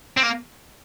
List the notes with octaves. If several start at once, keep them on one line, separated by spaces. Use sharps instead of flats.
C4
A#3